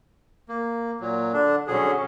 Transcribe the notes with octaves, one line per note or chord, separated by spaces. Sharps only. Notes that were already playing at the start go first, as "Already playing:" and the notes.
A#3
A#2 F#3
D3 D4
D3 F#3 C#4 G#4